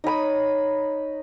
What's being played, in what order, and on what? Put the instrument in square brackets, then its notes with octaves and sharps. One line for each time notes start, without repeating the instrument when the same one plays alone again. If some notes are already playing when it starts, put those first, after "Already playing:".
[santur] D#4 C#5 B5 D#6